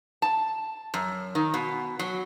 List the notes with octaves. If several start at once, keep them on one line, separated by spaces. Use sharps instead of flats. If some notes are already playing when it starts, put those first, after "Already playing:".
A5
F#2
D#3
B2
F#3